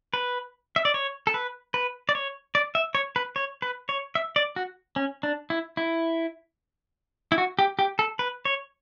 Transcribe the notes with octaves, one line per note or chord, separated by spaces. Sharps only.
B4
E5
D5
C#5
A4
B4
B4
D5
C#5
D5
E5
C#5
B4
C#5
B4
C#5
E5
D5
F#4
C#4
D4
E4
E4
E4
F#4
G4
G4
A4
B4
C#5